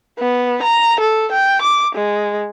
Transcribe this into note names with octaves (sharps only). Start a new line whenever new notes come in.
B3
A#5
A4
G5
D6
G#3